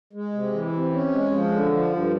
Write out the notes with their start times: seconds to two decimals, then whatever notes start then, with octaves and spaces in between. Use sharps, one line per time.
0.13 G#3
0.33 C3
0.52 E3
0.72 C3
0.93 C#4
1.12 G#3
1.32 F3
1.51 D3
1.71 F3
1.92 G2